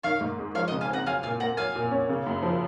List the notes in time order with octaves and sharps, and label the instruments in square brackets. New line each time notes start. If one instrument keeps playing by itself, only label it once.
[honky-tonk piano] D#3 [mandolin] C#5 F5
[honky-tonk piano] G#2
G#3
[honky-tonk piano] F3 [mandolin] C#5 F5
[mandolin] D#5 F#5
[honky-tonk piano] C#3
[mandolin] F5 G#5
[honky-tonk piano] C4 [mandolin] F#5 A#5
[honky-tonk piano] F#3 [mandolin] F5 G#5
[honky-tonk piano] A#2 [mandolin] F5 G#5
[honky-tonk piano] A#3 [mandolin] F#5 A#5
[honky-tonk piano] F#3 [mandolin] F5 G#5
[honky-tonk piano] A#2
C#4
C#3
F#2
F3